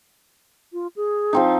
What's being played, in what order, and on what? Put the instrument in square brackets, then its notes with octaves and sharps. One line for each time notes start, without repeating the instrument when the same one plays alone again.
[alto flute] F4
G#4
[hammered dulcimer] F3 C4 D#4